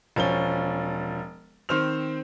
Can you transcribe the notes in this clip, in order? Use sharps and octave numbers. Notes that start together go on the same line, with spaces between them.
E1 F3 C#4 G7
D#3 C4 C5 F6 F7